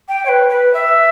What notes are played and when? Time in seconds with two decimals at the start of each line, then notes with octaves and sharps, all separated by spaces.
0.09 G5
0.25 C#5
0.29 B4
0.49 B4
0.74 E5